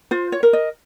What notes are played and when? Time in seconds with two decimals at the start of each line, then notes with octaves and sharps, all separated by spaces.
0.11 F4 C5
0.32 C#5
0.43 A#4
0.53 D#5